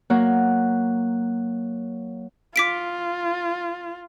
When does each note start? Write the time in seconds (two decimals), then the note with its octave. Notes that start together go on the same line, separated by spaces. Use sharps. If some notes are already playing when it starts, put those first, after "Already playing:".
0.10 F#3 A#3 F#4
2.56 F4 D6 B6 D7